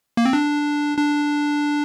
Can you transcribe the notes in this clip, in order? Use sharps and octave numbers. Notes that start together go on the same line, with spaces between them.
A#3
C4
D4
D4